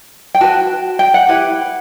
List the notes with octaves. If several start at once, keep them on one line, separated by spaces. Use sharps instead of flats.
G5
F#4 B4 A5
G5
F#5
E4 G4 B4